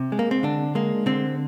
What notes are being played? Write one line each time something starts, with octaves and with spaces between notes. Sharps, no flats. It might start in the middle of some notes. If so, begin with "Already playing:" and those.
Already playing: C3
G#3
A#3
C4
D3 D4
G#3 A#3
D3 C4